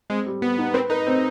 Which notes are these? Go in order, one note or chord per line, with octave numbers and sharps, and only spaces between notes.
G#3 C4
G3
G3 B3
D#4
C4 B4
D#4 B4
C4